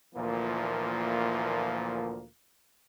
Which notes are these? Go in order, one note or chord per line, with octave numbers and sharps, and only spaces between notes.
D2 A#2 E3 F3 A#3